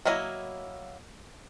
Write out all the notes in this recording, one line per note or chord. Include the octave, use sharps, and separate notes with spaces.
F#3 A#3 E4 D#5